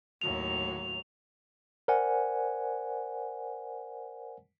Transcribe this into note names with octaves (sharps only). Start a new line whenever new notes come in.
D#2 A2 F#3 F7
A#4 C5 D5 F#5 G#5